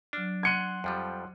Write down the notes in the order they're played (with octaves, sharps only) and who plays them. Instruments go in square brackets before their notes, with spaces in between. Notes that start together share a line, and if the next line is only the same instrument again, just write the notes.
[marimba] F#3 F6 [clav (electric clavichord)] D4
[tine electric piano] F#5 C6 F#6 [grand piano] G#6 C#7 D#7
[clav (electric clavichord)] F2 F3 G3